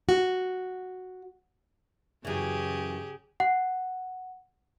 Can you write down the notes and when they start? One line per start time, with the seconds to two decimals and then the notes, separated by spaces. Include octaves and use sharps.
0.09 F#4
2.25 F#2 C#3 E3 G4 G#4
3.40 F#5